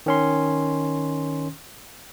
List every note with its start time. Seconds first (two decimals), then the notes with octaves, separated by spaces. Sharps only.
0.06 D#3 C#4 C6